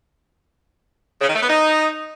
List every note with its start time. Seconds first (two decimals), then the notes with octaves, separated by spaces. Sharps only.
1.21 C#3
1.28 D#3
1.35 A3
1.42 B3
1.48 D#4